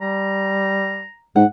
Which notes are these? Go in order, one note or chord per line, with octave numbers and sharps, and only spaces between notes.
G3 A#5
G#2 F#5